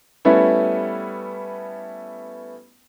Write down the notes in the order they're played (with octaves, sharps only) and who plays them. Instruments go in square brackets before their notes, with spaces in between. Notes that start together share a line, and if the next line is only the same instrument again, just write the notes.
[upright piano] G3 A3 B3 C#4 E4